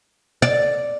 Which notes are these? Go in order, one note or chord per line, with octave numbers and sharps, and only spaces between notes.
D5